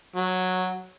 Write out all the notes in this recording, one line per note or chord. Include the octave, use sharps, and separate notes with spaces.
F#3